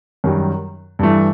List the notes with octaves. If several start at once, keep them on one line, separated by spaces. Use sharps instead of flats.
F#2 D#3 G3
G2 E3 A3